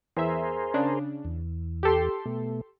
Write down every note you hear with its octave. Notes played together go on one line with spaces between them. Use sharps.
E2 G#4 A#4 C5 E5
C#3 D4
E2
G4 A4 C6
B2 A3